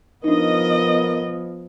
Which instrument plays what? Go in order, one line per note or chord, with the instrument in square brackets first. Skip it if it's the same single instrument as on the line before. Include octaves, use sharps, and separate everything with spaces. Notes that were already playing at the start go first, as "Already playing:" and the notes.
[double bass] F3 B3 [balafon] D4 D#4 [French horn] A#4 [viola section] D#5